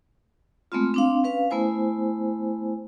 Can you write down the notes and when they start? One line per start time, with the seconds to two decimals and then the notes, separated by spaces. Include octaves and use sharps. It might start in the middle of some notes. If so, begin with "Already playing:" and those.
0.72 G#3 A3 B3 C4 F4
0.94 C4 D4 F5
1.24 C#4 B4 F5
1.51 A3 B3 E4 C5 G#5